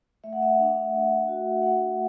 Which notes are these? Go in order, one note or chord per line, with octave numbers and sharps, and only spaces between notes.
A3 E5
F#5
E5
D4
A3
F#4
A3 F#5